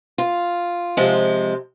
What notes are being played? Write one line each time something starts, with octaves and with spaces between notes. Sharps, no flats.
F4
C3 F3 G#3